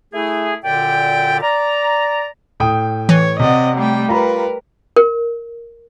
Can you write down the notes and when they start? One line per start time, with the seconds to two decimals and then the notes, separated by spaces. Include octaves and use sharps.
0.14 A3 E4 G#4
0.64 F#2 A#2 D3 G4 D5 G5
1.42 D5 A#5
2.60 A2 G5 D#6
3.09 E3 C#5
3.39 C3 C4 D5 D#5 F#5
3.77 G3 A3 G4 G5
4.08 F4 A#4 B4 A#5 B5
4.96 A#4